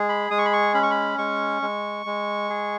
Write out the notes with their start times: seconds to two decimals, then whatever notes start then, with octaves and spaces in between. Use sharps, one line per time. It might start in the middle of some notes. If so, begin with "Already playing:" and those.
Already playing: G#3 G#4
0.09 B5
0.31 G#3 D#6
0.38 C#6
0.45 B5
0.53 C#6
0.74 C#4 B5
0.83 C#6
0.91 B5
1.18 G#3 C#6
1.62 G#3
2.06 G#3
2.50 G#4